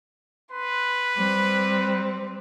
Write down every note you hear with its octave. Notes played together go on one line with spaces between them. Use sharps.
B4 C6
G3 C4